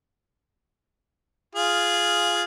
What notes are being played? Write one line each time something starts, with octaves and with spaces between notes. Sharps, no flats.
F4 G#4